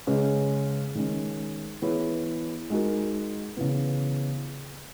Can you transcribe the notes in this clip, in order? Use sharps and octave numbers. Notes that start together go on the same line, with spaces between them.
C#3 G#3 C#4 G#4 B4
D#3 G#3 C#4
E3 B3 E4 G#4 C#5
G#3 D#4 F#4 A#4
C#3 E3 B3